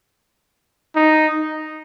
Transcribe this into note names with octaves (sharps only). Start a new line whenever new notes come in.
D#4